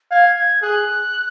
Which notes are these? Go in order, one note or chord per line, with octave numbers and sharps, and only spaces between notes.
F5 G#6
G#6
G#4 F#6